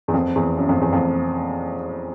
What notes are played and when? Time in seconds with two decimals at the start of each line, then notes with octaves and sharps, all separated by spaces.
0.08 E2
0.14 F2
0.36 E2
0.57 F#2
0.69 F2
0.81 E2
0.93 F2